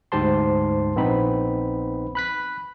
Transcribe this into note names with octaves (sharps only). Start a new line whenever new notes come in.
D2 G#2 G4 C5 A5 C6
A#1 B3 C4 D#4 B5
B5 F#6 B6